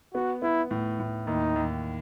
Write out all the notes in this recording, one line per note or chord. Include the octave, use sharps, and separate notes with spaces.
B3 F#4
B3 E4
A2
A2
D#2 D#4
D#2